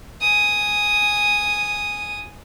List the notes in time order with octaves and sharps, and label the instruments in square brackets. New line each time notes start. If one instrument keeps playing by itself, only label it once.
[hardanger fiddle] G#5 D#6